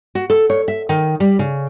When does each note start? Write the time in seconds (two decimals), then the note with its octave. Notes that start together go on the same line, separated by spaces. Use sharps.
0.15 F#4
0.30 A4
0.50 C#5
0.68 E5
0.89 D#3
1.20 G3
1.39 C#3